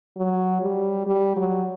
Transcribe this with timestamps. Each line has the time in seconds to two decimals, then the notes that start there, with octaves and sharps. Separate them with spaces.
0.17 F#3
0.62 G3
1.06 G3
1.36 F#3